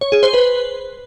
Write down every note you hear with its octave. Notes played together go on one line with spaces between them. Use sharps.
C#5
G#4
C5
B4